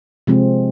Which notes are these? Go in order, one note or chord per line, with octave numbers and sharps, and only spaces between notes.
C3 F3 G#3 C4